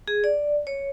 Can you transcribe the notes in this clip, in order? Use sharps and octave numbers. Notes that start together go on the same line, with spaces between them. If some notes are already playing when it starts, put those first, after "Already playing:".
G#4
D5
C#5